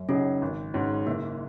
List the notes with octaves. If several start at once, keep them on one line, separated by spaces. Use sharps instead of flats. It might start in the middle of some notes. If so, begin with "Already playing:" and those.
Already playing: F#2
C#3 F#3 C#4 D#4 G#4
G#1
G#2 G#3 C#4 F#4
F#1 A#3